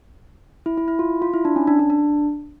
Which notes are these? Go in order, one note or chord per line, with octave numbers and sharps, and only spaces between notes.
E4
E4
E4
F4
F4
E4
D4
C#4
D4
D4
D4